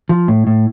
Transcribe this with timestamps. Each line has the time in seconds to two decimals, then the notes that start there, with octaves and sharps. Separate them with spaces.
0.09 F3
0.28 A2
0.47 A2